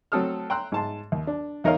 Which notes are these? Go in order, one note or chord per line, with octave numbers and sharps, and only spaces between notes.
F#3 A3 C4 A4 D#6 F6
G5 A#5 C6 E6 F#6
G#2 A5 C6
D#2
D4
E2 D#4 A#4 C#5 D#5 F5